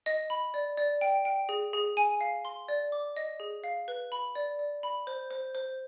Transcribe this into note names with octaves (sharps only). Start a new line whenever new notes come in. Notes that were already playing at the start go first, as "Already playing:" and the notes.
D#5
B5
D5
D5
G5
G5
G#4
G#4
G#5
F5
C6
D5
D6
D#5
G#4
F5
B4
B5
D5
D5
B5
C5
C5
C5